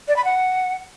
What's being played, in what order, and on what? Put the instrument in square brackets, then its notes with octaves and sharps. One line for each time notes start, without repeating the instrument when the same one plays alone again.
[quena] D5
B5
F#5